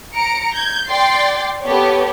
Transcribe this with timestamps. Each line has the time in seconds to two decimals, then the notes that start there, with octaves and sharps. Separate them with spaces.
0.15 A#5 C#7 D7
0.54 G6 G#6
0.88 D5 G5 C6 A6 C7
1.64 B3 G4 A4 C#5